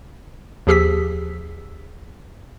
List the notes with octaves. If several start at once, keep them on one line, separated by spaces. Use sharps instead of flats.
D#2 F3 G4 G#4 E6 B6